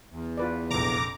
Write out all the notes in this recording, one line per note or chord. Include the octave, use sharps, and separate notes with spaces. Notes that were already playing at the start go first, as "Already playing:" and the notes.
E2
F4 B4 D5
F1 A#1 A#5 D6